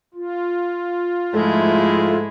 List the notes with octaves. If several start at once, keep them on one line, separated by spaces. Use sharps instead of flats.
F4
G#2 F3 G#3 A3 E4